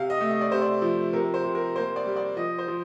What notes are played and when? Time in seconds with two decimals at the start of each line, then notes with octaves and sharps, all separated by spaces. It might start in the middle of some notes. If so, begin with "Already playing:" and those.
Already playing: C3 F5
0.10 D#5
0.20 A3
0.31 D#5
0.41 D5
0.51 C3 C5
0.62 D5
0.82 F3
1.13 C3 A#4
1.34 C5
1.45 C3
1.55 A#4
1.76 A#3 C5
1.96 D5
2.06 G3
2.16 D5
2.37 F3 D#5
2.58 C5
2.68 F3